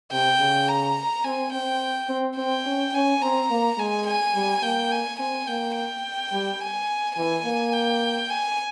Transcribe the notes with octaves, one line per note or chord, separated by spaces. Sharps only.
C3 G5
C#3
A#5
C4 G#5
C4 G5
C4
C4 G5
C#4
C#4 G#5
C4 A#5
A#3
G#3 G#5
G#5
G3
A#3 G5
G#5
C4 G#5
A#3 G5
G5
G3
G#5
E3 G#5
A#3
G5
G#5